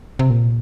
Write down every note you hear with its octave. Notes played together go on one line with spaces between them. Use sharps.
C3
A#2